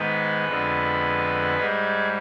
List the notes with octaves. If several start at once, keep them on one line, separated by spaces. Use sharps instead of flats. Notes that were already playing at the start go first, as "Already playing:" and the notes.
Already playing: G#2 D#3 G#3 B3 B4
F2 D3 G#3
G#2 G3 G#3 G#4